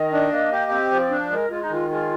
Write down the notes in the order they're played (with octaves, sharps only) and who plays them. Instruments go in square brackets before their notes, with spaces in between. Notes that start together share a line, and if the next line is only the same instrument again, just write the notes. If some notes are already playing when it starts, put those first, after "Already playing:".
Already playing: [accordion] D#3 [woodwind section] D#5
[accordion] D4
A#3
G4
[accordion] C4 [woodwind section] D#5
[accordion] F3 [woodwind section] D5
[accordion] D4
[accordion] G#3 [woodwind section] A#4
[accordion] G#3 [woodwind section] F4
[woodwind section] D#4
[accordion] D#3 [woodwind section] F4
[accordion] G#3 [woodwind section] F4